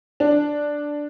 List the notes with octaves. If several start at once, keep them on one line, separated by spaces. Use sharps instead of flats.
D4